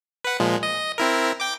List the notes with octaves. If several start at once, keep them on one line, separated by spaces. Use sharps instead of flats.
B4 F#5
A#2 F3 G#3
D#5
C4 E4 A#4
G5 D6